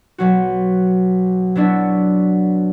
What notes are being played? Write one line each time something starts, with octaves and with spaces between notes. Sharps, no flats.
B1 F#3 F#4
F#3 B3 D4 E4 F#4